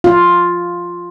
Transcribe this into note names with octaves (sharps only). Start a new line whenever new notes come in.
F4